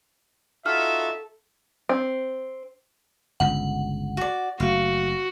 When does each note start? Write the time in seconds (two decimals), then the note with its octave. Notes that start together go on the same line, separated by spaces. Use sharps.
0.66 D#4 F4 F#4 A4 E5 F6
1.89 C4
3.40 G1 C#2 F#5
4.17 F#4 D5
4.60 F#1 A3 F#4 F5